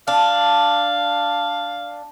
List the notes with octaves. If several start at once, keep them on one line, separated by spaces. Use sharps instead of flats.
D4 F5